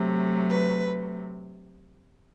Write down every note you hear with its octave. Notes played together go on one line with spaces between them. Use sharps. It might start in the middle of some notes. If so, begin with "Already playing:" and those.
Already playing: C3 F#3 A3
B4